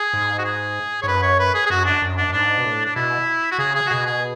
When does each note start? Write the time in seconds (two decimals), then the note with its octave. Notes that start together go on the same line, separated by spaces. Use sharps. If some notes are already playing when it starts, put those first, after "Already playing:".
Already playing: G#4
0.13 G#2
0.39 F#4
0.44 G#4
1.02 G#2 C#5
1.08 F#2 B4
1.23 C#5
1.39 B4
1.54 G#4
1.66 G#4
1.70 F#2 F#4
1.86 D4
2.02 F#2
2.17 D4
2.29 F#2
2.33 G#2 D4
2.58 B2
2.65 A2
2.85 D4
2.96 B2 E4
3.52 F#4
3.58 C#3 G#4
3.75 G#4
3.86 F#4
3.90 B2 G#4
4.06 G#4